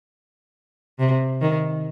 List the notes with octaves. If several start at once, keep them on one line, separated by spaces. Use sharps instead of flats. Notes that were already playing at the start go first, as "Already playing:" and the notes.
C3
D#3